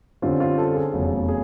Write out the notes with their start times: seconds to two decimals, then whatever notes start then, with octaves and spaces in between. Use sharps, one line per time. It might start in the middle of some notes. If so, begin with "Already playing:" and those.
0.22 F#2 D3 G3 C4 F4
0.40 F4
0.58 A4
0.76 G#4
0.94 F1 E2 C#3 F#3
1.28 G#4